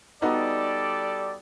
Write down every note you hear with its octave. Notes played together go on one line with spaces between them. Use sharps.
G3 B3 D#4 F#4 A4 D5